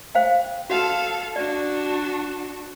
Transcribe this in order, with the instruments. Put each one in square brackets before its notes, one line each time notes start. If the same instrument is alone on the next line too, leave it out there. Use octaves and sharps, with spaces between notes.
[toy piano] C5 F5 G5
[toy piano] F#4 F#5 [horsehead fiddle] A4 F5
[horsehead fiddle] D4 F#4 [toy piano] D5